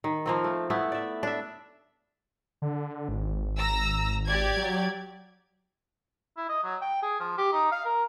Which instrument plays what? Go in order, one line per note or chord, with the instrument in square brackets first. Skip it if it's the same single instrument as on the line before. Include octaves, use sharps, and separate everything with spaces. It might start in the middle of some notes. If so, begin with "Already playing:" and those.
[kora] D#3
F3 A#3 C4
A3
A3 B3 E4
D5 E5
D4 E5
[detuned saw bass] D3
G#1
[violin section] A#5 E6 A#6
G4 D5 G#6
[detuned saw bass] F#3
[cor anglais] E4
D#5
F#3
G5
G#4
F3
G4
D#4
F5
A#4